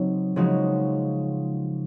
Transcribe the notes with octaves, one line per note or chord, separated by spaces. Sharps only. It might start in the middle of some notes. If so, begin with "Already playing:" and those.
Already playing: C#3 F#3 C4 D#4
C#3 F3 G#3 D#4 F#4